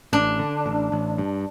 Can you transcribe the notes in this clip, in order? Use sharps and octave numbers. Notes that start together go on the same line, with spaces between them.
A1 D4
D3
A1
A1
G2